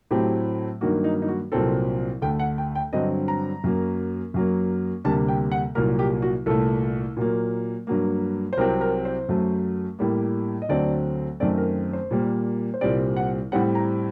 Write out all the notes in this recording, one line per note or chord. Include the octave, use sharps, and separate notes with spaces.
A2 F#3 A3 C4 G4
G2 D#3 F#3 A#3 F#4
D#4
D#4
F#4
C2 A#2 F#3 C4 A4
D2 D3 A3 G5
F#5
G5
G5
G2 D3 F#3 C4 D#5
A#5
F#2 F#3 A#3
F#2 F#3 A#3
D2 C3 G3 A#3 A5
G5
F#5
C2 A#2 F#3 A#3 A#4
G4
F#4
C2 A#2 A3 A4
A#2 F#3 A#3
G2 F#3 A#3
C5
C2 C3 F#3 C4 A#4
A#4
C5
F#2 F#3 A3
A2 G3 A#3
D#5
D2 D3 F#3 A3 C4 D5
F#2 D#3 A3 C4 D5
A#4
C5
A#2 G3 A#3
C5
C2 A#2 G3 C4 D5
F#5
A2 G3 C4 F#5
A#5